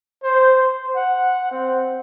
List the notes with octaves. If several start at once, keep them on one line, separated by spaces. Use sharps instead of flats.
C5
F#5
C4